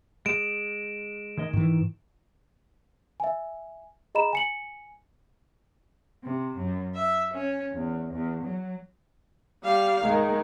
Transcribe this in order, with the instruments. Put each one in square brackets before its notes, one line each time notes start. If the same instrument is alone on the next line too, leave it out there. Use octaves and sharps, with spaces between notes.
[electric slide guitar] G#3 [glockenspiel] D7 E7
[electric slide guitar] D#3 G#3 D#5
[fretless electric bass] G#2 E3 [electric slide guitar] D#3
[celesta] E5 G#5
G#4 D#5 A#5 B5 E7
G#5 C#7 F#7
[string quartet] C3
F#2
E5
C#4
E2
E2
F#3
[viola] G3 F5
[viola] D#3 [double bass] G#3